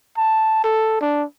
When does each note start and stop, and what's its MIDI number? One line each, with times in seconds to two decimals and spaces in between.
0.17 0.59 81
0.64 0.99 69
1.01 1.23 62